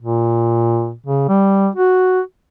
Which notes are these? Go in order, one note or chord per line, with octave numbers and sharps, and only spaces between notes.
A#2
C#3
G3
F#4